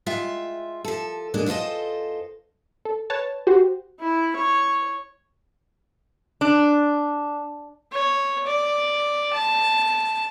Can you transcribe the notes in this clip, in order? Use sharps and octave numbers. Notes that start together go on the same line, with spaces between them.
G#3 F4 E5 G5
F3 A4
D#2 A#2 D3 G#3 D4
E2 F4 A4 C5 D#5
A4
B4 C#5 A5
F#4 G4 C5
E4
C#5
D4
C#5
D5
A5